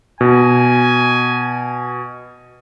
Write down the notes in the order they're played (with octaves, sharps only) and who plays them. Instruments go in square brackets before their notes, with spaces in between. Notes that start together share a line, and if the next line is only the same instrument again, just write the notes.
[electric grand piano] B2 [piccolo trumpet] G#5